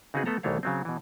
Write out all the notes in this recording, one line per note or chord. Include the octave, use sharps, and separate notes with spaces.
C#3 C4 D#4 F#4 G#4 B4
A3 B3 A4 A#5
C2 D#3 E3 A3 C#5 F5
C#3 F#3 C4
B2 E3